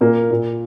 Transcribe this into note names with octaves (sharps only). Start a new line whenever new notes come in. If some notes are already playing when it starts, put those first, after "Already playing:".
A#2 A#3
A#2